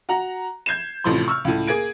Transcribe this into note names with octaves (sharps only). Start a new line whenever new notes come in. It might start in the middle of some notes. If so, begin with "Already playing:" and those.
F#4 F#5 A#5
G6 G#6 C7 E7
A1 A2 C3 F3 C6
C#6 E6 F6
C#2 A2
A#3 G#4 G#6 D7